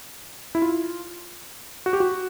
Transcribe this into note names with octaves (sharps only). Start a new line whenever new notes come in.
E4
F4
F#4
G4
F#4